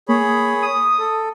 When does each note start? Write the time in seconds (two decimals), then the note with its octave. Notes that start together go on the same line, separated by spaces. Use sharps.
0.09 A#3 G#4 C#5 B5
0.62 D#6
0.99 A4